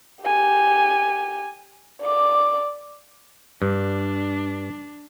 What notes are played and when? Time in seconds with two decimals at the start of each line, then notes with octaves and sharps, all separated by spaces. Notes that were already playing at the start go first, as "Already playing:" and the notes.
0.24 G4 G#5
2.01 D5 D6
3.62 G2 D4